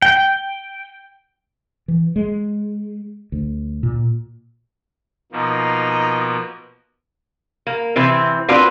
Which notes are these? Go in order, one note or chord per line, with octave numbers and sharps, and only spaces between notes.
G5
E3
G#3
D2
A#2
B2 F3 A#3 D#4
A#3
C3 E3 C4
A#3 C4 D4 F4 F#4 B4